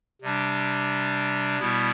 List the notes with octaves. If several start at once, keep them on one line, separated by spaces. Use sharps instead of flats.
C3 G3 D4
B2 G3 B3 E4